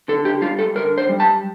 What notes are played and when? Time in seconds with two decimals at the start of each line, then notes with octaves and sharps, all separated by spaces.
0.08 D3 A4
0.25 G4
0.42 G3 F4
0.59 A4
0.75 D3 A#4
0.98 C5
1.09 G3
1.20 A5